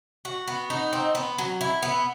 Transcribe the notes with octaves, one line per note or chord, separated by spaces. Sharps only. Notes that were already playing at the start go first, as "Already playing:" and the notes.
F#4
B3
D#4
C4
B3
F#3
E4
B3